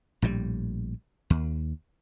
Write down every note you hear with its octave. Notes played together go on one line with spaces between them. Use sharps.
A#1 A2 C3 G3
D#2